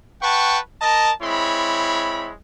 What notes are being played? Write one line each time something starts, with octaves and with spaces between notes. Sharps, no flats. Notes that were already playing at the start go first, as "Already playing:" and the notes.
B4 F#5 G5 A5 C#6
A#4 D#5 A5
G#3 C4 E4 C#5 B5